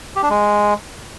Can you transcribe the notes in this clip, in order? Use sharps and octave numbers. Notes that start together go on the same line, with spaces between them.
G4
D4
G#3